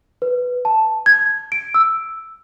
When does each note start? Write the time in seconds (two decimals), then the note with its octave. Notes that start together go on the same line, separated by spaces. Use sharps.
0.22 B4
0.65 A5
1.06 G#6
1.52 D7
1.74 E6